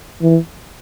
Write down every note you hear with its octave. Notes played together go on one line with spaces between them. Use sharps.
E3